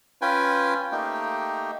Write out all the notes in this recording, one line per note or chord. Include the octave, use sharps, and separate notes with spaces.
C#4 F4 B4 G5 G#5
A3 A#3 D#4 G4 G5